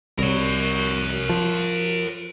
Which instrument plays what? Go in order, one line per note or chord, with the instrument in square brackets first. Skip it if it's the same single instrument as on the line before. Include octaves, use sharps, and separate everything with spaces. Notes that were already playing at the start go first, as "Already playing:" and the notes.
[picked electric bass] C2 [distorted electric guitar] A#4 C#5
[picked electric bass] F3